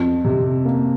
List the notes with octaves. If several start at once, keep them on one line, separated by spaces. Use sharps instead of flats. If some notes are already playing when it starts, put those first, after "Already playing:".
Already playing: F2
C3
A#3